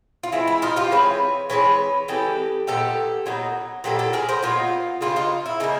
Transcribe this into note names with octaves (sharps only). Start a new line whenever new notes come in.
F4
E3 G#3 C4 E4
E4
D#4 F4
F4 G4
E3 G#3 C4 B4 C#5
E3 G#3 C4 B4 C#5
E3 G#3 C4 G4 A4
A#2 F#3 B3 D#4 G4 A4
A#2 F#3 B3 D#4
A#2 F#3 B3 D#4 G4 A4
G4 A4
G#4 A#4
A#4 C5
A#2 F#3 B3 D#4 F4 G4
C#3 F3 A#3 D4 F4 G4
D#4 F4
E4
C#3 F3 A#3 D4 D#4